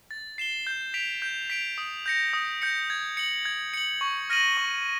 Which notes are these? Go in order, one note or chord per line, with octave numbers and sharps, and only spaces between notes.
A6
C7 E7 G7
G6
B6 D7 F7
G6
B6 D7 F7
D#6
G6 A#6 C#7
D#6
G6 A#6 C#7
G#6
C#7 F#7
G#6
C#7 F#7
C#6
F6 A#6 D#7 F#7
C#6